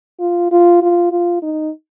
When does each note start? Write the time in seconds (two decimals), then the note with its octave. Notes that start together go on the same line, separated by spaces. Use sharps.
0.20 F4
0.51 F4
0.82 F4
1.11 F4
1.42 D#4